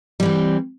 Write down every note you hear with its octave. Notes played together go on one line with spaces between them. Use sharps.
E3 G3 C4